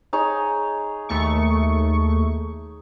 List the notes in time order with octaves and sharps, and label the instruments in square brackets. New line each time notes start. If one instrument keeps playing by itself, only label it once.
[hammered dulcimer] D#4 G#4 C#5
[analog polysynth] D#2 A3 C#6